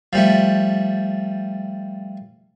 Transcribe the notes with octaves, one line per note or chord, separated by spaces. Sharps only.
F3 G3 A3